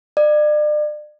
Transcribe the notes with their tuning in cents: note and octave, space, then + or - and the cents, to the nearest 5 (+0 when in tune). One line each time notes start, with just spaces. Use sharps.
D5 +40